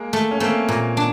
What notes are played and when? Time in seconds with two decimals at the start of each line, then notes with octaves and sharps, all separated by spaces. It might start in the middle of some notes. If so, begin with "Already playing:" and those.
Already playing: G#3 A#3
0.13 A3
0.31 C#4
0.40 A3 A#3 C4
0.68 A#2
0.97 D4